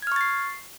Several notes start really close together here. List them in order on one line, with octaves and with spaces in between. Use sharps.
G#6 F6 C#6 A6 C7